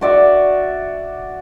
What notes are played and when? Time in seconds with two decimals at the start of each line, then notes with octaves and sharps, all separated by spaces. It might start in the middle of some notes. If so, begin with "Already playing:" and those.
0.01 F#4 D5 E5